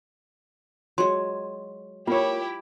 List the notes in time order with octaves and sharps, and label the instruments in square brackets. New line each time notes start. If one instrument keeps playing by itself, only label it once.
[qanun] F#3 G#3 [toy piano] C6
[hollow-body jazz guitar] A#3 C#5 [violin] E4 G4 [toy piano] F4